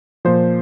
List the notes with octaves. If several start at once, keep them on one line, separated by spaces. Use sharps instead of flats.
A#2 F3 C5